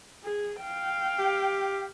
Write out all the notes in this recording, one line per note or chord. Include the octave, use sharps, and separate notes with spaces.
G#4
F5 G5
G4